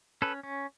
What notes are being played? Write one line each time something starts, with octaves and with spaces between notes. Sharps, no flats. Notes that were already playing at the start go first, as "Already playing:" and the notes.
C#4 A4 B4
C#4